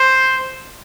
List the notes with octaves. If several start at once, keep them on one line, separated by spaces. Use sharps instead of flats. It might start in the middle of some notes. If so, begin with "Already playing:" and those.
Already playing: C5